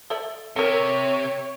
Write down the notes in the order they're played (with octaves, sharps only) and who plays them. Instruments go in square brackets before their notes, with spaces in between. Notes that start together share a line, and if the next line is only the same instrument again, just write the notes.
[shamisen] A4 D5 E5
[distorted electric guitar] C3 [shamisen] A4 A#4 [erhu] C#5